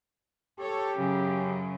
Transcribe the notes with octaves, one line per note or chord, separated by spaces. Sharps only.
G4 A4 C#5
F#2 C#3